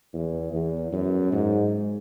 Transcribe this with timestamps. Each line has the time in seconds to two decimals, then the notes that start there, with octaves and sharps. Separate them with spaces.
0.14 E2
0.53 E2
0.92 F#2
1.32 G#2